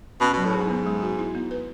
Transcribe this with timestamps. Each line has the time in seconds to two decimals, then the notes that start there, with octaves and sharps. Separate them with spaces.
0.21 B2 C#4
0.33 B2
0.37 F#3
0.45 A2
0.53 G#2 G#4
0.70 B3
0.86 G#3
1.02 F#4
1.19 E4
1.35 B3
1.51 B4